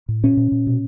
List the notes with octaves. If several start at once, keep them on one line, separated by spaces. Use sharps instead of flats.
A2
A#2 C#4
A#2
A#2
B2